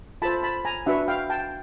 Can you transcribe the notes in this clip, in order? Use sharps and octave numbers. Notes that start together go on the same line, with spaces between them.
F4 A4 C5 A5 B5
A5 B5
G#5 A#5
D4 F#4 B4 E5 F#5
F5 G5
G5 A5